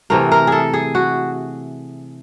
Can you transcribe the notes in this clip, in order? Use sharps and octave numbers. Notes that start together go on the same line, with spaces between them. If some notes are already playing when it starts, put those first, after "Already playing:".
C3 E3 A3 A#4
A#4
G#4 A4
G#4
F#4